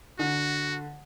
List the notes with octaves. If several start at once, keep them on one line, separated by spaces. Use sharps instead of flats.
D3 F#4